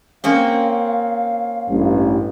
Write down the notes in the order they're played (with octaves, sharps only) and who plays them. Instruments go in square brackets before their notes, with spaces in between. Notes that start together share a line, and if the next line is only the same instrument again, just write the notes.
[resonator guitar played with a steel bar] A#3 C4 C#4 [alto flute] F5
[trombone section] A1 G2